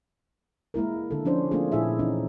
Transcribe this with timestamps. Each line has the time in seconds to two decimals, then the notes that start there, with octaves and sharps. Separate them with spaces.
0.74 G#3 A#3 E4 A#4
1.11 D3 A4
1.25 F3 C#4 D4 C5
1.51 A3 A#3 C4 D4 F4 G#4
1.72 A#2 E4 G#4 E5
1.99 E3 C4 C#4 D#4